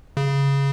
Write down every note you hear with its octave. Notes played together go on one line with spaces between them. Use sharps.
C#3